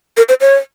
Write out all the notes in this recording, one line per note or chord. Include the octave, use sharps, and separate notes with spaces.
A#4
C5
C#5